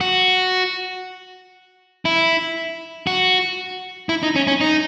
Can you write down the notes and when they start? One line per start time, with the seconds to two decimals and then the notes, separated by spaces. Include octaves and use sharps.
0.01 F#4
2.05 E4
3.07 F#4
4.09 E4
4.23 D#4
4.36 C#4
4.47 C#4
4.61 D#4